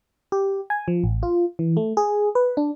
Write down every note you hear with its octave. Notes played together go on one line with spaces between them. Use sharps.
G4
G#5
F3
A1
F4
E3
A3
G#4
B4
D4